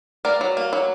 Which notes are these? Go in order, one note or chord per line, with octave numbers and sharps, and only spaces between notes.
A#3 A#4 D5
F#3
A#3
F#3